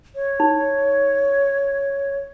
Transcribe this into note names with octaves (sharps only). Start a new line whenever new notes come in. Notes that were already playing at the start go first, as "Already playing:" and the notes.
C#5
D#4